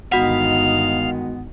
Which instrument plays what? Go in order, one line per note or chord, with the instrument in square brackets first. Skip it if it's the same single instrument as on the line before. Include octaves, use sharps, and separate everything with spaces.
[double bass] G1 D#4 [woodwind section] D#3 G#3 B3 [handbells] F#4 F#5 [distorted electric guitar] F5